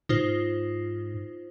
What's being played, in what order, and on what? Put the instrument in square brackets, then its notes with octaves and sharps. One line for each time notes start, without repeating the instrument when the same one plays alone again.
[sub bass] G#2 [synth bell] D#4 F4 C5